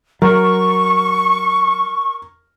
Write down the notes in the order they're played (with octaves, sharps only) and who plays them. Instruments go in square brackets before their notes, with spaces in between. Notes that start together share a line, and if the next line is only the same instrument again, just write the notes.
[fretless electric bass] F#3 [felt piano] A#4 [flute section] C#6